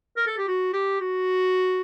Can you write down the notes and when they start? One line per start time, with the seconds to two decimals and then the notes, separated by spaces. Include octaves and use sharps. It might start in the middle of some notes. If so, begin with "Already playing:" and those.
0.17 A#4
0.27 A4
0.38 G4
0.48 F#4
0.73 G4
1.00 F#4